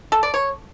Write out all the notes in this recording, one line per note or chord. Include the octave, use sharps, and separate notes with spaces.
A4
D5
C#5